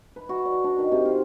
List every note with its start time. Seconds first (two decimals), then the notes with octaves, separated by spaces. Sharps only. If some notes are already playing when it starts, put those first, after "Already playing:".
0.16 B4
0.29 F#4
0.45 D5
0.64 D4
0.78 D#3
0.92 C3
1.05 F4